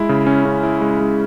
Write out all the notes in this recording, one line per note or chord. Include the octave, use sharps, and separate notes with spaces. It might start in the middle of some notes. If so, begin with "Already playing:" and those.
Already playing: G#3 E4
C#3
C#4
C#3
E4
G#3
G#3